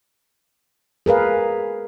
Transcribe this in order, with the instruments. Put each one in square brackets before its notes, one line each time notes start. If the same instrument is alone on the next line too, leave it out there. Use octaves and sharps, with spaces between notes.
[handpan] G#4 A#4 B4 F5